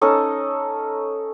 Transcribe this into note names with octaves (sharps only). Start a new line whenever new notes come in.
C#4 D#4 A4 D#5